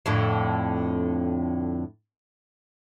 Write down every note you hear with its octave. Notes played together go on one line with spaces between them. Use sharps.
F2 A2 D3